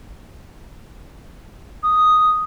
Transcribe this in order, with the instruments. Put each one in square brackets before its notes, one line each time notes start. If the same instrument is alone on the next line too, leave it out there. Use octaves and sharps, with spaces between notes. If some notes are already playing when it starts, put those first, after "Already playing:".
[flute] D#6